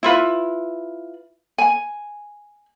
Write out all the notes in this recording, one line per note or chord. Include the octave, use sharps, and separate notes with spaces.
E4 F4 B4
G#5